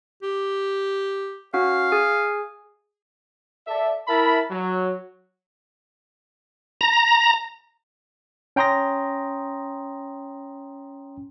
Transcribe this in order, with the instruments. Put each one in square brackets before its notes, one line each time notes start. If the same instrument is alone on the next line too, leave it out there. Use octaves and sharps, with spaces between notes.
[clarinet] G4
[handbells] C#4 F#4 F#5 [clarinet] F5
[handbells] G#4 G#5
[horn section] A4 D5 E5
E4 A#4 E5 A5 B5
F#3
[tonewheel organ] A#5
[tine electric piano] C#4 G5 A#5 C6 D#6 A#6